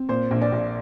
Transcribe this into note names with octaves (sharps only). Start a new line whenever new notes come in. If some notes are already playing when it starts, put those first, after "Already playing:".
Already playing: C4
A#2 C5
A#1
D5
A#1